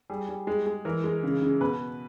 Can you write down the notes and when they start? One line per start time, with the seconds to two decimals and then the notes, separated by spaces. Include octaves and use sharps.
0.10 G3 G#4
0.29 G3
0.47 G#3
0.67 G#3
0.85 E3 A#4
1.04 G#3
1.23 C#3
1.42 C#3
1.61 B2 B4